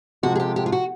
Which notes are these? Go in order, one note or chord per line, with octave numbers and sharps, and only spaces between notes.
C3 F3 G#3 F#4
G#4
G4
G4
F4
F#4